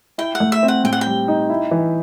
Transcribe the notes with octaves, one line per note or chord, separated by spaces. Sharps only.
E4 G5
F#5
A3
E5
C4
F#5
A2 G5
F#5
G5
G3
D#4
E4
E3